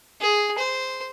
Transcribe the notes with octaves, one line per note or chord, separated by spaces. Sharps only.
G#4
C5